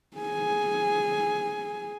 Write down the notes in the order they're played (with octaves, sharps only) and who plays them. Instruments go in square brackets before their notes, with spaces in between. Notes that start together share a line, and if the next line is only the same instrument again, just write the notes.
[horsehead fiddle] G#4 G#5